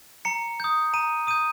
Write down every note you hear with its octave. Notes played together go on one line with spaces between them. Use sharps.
A#5 C#7
D#6 G6
A#5 D#7
D#6 G6 D#7